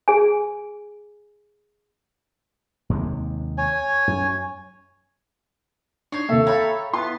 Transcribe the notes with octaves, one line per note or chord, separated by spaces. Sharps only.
G#4 G#5
D#2 C3 G#3
C#5 G#5
F#2
D4 D#4 C#5 C6 C#6
D#2 C3 A#3 A4 E5
C#5 F5 G5 A#5 B5
B3 E4 F4 C6